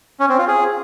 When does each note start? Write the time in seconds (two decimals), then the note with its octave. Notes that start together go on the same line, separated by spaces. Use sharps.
0.20 C#4
0.29 C4
0.38 F4
0.48 G#4